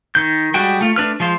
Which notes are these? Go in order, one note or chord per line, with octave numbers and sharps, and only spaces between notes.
D#3 G6
G3 G#3 F#4 G5
A3 F4
A3 D4 B4 F6
F3 G#3 F4 C5